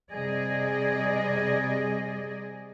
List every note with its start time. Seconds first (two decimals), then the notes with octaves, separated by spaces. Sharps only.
0.13 C3 G3 G#4 D5 D#5